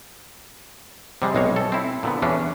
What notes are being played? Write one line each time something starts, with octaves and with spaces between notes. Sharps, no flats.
C3 G3 G#3
B1 G#3 C4 C#5
A4
C4 E4
A#2 D3 B3
E2 E3 C#4 D4